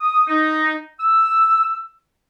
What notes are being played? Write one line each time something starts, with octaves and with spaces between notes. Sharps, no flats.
D#6
D#4
E6